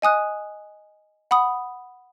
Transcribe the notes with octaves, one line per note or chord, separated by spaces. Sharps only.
D#5 G#5 D#6 F#6
F#5 B5 D#6